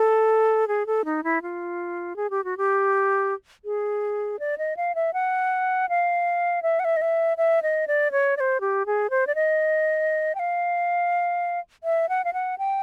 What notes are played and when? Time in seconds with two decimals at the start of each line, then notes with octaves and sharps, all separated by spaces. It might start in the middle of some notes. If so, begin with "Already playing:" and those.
Already playing: A4
0.68 G#4
0.86 A4
1.05 D#4
1.24 E4
1.42 F4
2.16 G#4
2.30 G4
2.44 F#4
2.57 G4
3.65 G#4
4.40 D5
4.58 D#5
4.77 F5
4.95 E5
5.14 F#5
5.89 F5
6.63 E5
6.80 F#5
6.85 E5
6.97 D#5
7.02 E5
7.37 E5
7.63 D#5
7.88 D5
8.12 C#5
8.37 D5
8.40 C5
8.61 G4
8.86 G#4
9.10 C5
9.27 D5
9.35 D#5
10.35 G5
10.39 F5
11.84 E5
12.09 F#5
12.25 F5
12.33 F#5
12.58 G5